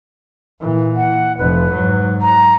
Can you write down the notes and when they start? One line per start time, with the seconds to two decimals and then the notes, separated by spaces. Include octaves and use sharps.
0.60 A#2 E3
0.95 F#5
1.38 F1 F2 B4
1.74 G#2 F#3
2.21 A#5